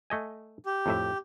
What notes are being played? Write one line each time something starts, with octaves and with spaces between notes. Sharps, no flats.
A3 D#5 G#5
G4
F2 A2 E5